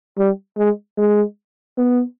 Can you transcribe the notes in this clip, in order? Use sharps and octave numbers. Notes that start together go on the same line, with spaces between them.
G3
G#3
G#3
B3